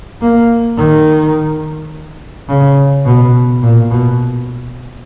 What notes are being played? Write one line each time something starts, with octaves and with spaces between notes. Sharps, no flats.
A#3
D#3
C#3
B2
A#2
B2